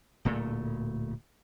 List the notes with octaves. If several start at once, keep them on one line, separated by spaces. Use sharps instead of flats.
D1 A#2 A3